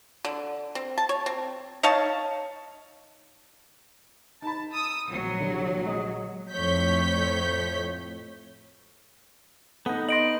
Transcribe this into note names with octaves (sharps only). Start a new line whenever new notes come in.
D3
C4
A5
C#5
C4
D#4 C#5 F5 A5
D#4 A5 B5
D#6 E6
A#1 F#3
C2 D3
G#3 D#5 D#6
F2 A2 C#5 G6 B6
B3 D#4 A4 F#5
D#5 C6 A#6 D7 F#7